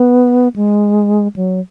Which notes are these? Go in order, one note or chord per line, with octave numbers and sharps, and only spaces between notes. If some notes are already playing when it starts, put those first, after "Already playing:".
Already playing: B3
G#3
F#3